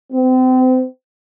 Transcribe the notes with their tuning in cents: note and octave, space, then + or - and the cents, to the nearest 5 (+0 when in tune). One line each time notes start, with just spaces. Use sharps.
C4 -35